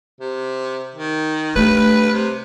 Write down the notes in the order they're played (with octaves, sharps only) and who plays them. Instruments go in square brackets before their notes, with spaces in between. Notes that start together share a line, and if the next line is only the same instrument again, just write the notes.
[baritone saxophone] C3
D#3
[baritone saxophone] G2 [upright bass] A3 [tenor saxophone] B4
[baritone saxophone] C3